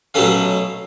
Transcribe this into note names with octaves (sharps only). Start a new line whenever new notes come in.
B2 F#3 A3 C#4 F5